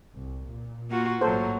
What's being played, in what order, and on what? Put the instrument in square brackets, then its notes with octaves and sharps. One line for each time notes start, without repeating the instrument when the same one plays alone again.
[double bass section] C2
A#2
[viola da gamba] A#3 F4 F#4
[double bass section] A1 G#2 [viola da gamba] F#3 A#3 [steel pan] A4 C5